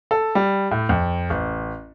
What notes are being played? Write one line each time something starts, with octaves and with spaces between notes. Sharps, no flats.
A4
G3
A2
F2
A1